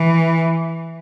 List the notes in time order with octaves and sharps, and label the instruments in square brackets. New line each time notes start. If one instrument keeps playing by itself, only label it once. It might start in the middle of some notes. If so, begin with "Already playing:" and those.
Already playing: [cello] E3